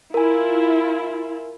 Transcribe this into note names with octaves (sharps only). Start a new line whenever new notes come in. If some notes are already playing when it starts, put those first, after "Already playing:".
E4 F4 A#4 G#5